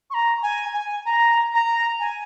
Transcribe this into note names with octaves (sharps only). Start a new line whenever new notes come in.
C#6
A#5
G#5
G#5
A#5
A#5
G#5